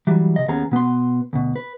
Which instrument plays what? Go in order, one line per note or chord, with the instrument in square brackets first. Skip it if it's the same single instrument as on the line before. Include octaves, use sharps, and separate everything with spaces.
[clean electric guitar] E3 F#3 G3
C3 D#5
D#2 B3 C#4 G#4 A#5
B2 B3 B4 C6
D2 B2
B4